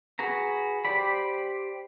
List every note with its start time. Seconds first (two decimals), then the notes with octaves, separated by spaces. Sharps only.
0.19 F#4 G#4 B4 A#5
0.85 G4 C5 D5 B5